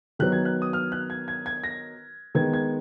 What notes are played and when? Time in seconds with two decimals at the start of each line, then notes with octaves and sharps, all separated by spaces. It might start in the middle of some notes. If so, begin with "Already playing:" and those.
0.19 D#3 F#3 B3 F#6
0.32 G#6
0.45 F#6
0.62 D#6
0.73 F6
0.92 F#6
1.10 G#6
1.28 G#6
1.46 G#6
1.64 A#6
2.35 D#3 G#3 B3 G#6
2.54 G#6